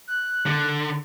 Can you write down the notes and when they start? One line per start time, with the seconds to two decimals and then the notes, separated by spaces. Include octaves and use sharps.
0.07 F#6
0.46 D3